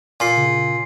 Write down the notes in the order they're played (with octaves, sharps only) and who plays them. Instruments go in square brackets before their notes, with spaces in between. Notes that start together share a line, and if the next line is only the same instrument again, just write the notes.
[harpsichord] A#2 [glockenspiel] G#5 C6 C7
[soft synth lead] C#3